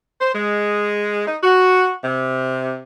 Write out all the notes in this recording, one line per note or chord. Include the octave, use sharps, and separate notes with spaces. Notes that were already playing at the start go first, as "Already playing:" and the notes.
C5
G#3
D#4
F#4
C3